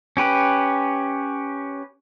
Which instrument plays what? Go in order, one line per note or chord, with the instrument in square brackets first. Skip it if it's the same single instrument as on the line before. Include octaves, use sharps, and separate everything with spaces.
[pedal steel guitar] C#4 G4 B4